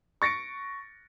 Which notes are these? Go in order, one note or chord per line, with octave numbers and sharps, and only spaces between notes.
C#6 A6 A#6 C#7 D7